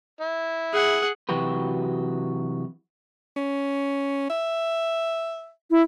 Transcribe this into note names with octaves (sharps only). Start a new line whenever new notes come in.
E4
G#4 F#5
C3 E3 F#3 F#4 G4 B4
C#4
E5
E4